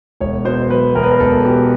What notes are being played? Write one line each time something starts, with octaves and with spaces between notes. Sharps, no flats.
E1 C#5
B2 C5
F#3 B4
E2 A#4
B4
A#4
E1 A4
B2 G4